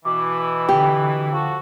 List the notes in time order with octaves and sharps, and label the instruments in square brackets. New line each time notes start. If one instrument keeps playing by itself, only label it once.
[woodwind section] B2 E3 [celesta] D6
[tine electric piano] D3 G5 [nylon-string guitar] G4
[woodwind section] F3 F#4 A4